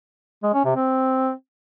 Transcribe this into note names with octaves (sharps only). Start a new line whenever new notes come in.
G#3
C#4
C3
C4